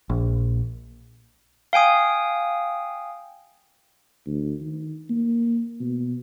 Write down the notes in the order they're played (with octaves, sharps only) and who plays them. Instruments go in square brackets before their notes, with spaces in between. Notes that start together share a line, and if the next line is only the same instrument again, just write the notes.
[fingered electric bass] A#1
[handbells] F5 G5 G#5 D#6
[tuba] D2
D#3
A#3
B2